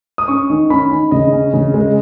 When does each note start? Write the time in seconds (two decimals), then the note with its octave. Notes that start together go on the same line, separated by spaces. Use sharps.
0.18 D#6
0.28 C#4 C#6
0.50 D#3
0.70 C#4 B5
0.91 D#3
1.11 C#3 D#5
1.32 C#4
1.54 C#3
1.74 G#3